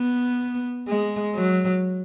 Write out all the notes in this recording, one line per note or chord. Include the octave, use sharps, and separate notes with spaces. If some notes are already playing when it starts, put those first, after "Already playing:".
Already playing: B3
G#3
F#3